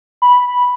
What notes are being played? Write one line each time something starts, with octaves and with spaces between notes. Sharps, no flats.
B5